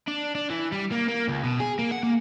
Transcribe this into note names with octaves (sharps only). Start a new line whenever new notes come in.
D4
D4
E3
G3
A#3
A#3
C#2
B2
G#4
A#3
F#5
A#3